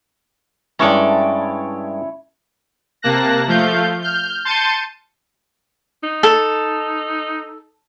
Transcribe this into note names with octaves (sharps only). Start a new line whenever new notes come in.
G2 G#3 C#4 E4 A4 C#5 D5 A#5
C3 A#3 A5 F#6 A#6
F3 A3 F5 G6
F6 G6
A5 C6 G6 A6 C#7 D#7
D#4
A4